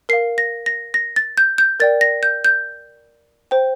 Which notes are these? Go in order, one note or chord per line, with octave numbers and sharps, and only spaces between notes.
A#4 F5 C7
A#6
A#6
A#6
A6
G6
G6
A#4 D5 G5 A6
A#6
G6
G6
C5 G5